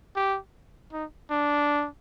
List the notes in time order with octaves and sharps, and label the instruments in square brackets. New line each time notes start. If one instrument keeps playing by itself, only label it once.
[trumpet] G4
D#4
D4